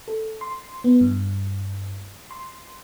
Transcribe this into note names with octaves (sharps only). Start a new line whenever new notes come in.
A4
C6
B3
G2
C6